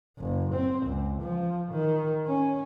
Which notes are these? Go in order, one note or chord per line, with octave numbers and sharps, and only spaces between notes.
F#1
C4
C#2
F3
D#3
C#4